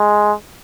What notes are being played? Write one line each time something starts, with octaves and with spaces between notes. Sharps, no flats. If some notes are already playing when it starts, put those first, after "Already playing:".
Already playing: G#3